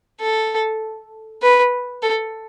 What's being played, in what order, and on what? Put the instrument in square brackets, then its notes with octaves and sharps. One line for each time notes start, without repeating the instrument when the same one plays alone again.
[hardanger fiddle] A4
B4
A4